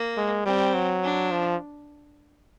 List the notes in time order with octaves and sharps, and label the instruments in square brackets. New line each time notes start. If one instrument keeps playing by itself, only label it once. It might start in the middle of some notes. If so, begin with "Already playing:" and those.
Already playing: [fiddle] A#3
[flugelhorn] G#3
[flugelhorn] G3 [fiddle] C4
[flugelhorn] F#3
[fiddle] D4
[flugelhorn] F3